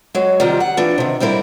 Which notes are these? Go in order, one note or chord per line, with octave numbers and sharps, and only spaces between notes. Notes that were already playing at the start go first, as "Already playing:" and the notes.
F#3 G#3
C3 D#3 F3 G3
F#5
E3 F3 D4
C3 D#3
G#2 G3 C4 E4 A#4